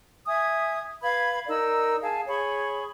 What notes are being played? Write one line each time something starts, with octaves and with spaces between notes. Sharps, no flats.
E5 G#5 D#6 G#6
B4 F5 B5 G#6
D#4 A#4 D5 E6
G#4 F5 G#5 A5
G#4 C#5 B5 C#6